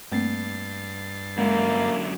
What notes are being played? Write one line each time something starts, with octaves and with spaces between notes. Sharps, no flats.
G2 A3 A#3 C4 A6 C7
F#2 D3 G#3 A#3 E4